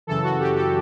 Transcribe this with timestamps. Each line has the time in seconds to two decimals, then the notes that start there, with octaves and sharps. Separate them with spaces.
0.07 F#2 C#3 E3 A4
0.23 F#4
0.39 G4
0.55 A4